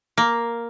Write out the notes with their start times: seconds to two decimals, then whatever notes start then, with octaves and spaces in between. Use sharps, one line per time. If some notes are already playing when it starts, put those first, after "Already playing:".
0.17 A#3